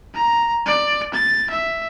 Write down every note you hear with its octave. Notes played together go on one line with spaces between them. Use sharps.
A#5
D5
A6
E5